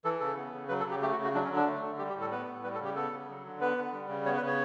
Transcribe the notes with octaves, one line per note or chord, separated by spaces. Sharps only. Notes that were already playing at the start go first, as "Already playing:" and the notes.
E3 A4
C#3 A4
B3
C#3
F#3 B4
A4
C#3 G4
A3 G4
F#4
C#3
F#4
F#3 D4
C#4
D3
D4
A3
D3
G3 G4
G4
A2
A4
B3 B4
A2
G3 B4
A4
C#3 G4
B3 A4
C#3
F#3
D3
B3 B4
D3
G3
C#3
B3 C#5
B4
C#3
C#5